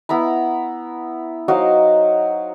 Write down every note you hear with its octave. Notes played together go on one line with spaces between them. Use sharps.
B3 E4 A#5 B5
F#3 D#4 C5 F5